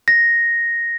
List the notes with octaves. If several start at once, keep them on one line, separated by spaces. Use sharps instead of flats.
A#6